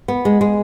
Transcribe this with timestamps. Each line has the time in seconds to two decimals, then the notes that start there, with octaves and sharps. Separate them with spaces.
0.08 B3
0.25 G#3
0.41 G#3